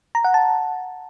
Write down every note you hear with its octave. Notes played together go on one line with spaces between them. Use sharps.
A#5
F#5
A5